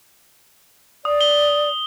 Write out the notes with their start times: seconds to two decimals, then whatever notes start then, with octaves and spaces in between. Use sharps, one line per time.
1.05 D5 D#6
1.21 G7